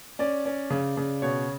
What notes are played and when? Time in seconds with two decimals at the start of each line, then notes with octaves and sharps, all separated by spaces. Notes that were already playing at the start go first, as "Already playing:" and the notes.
0.19 C#4 D5
0.45 C#4
0.70 C#3
0.97 C#3
1.22 B2 C#5